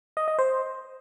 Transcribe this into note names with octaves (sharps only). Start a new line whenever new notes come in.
D#5
D#5
C5